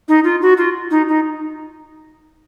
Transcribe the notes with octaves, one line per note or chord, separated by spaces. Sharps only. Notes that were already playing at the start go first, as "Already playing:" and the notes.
D#4
F4
F#4
F4
D#4
D#4